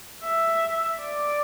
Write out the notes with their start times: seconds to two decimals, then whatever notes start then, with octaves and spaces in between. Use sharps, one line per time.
0.24 E5
1.02 D5